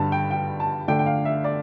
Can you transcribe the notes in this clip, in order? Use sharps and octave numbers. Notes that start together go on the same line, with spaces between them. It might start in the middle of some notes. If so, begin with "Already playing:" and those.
Already playing: G2 D3 G3 A5
G5
G5
A5
D3 A3 D4 G5
G5
F5
E5
D5